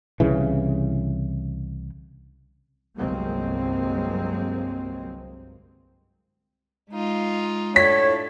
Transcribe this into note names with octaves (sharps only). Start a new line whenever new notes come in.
C2 C#3 E3
G1 C2 F#3 G#3 A#3 C4
G#3 D#4 F4
A2 D4 F4 A4 C#5 B6